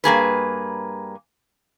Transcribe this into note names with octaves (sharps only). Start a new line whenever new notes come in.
G2 A#3 G#4 B4